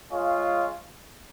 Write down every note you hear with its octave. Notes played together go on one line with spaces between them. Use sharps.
G#3 F4 G#4 C#5 F5